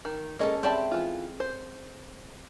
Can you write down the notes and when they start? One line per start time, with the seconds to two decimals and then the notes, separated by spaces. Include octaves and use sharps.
0.05 D#3
0.39 G#3 A#3 C#4 A4 D#5
0.63 C4 G4 D5 E5 A5 B5
0.91 E3 F4
1.40 C5